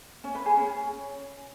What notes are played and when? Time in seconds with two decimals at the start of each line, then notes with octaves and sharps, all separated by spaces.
0.24 C#4
0.35 B4
0.46 G#4
0.57 C#4